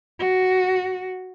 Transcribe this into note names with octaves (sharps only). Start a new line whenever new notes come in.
F#4